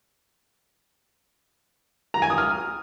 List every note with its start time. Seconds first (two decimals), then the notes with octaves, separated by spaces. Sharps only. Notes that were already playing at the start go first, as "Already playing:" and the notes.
2.14 A#5
2.22 G#5
2.30 D#6
2.38 F6